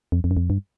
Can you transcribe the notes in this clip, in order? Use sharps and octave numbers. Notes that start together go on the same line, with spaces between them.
F2
F2
F#2
F2
G2